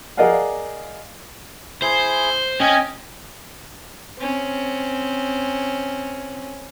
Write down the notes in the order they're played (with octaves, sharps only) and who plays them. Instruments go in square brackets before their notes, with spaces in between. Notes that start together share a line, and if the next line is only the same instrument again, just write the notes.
[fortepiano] G#4 A#4 D5 D#5 F5 F#5
[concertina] E4 G#4 [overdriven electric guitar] C5
[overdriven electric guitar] C#4 [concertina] D#5 G5 G#5
[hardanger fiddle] C4 C#4